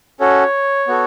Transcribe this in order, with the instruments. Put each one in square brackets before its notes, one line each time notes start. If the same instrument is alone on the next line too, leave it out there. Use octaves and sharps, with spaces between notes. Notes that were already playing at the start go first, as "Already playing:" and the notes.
[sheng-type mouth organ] C#4 F#4 A4 C#5
B3 F#4 A4